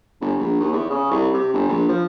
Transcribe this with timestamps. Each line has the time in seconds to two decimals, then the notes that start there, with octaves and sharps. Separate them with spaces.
0.21 G1
0.39 A#1
0.60 D#2
0.73 E2
0.90 C#3
1.11 C2
1.34 C3
1.54 G1
1.69 A#1
1.89 F3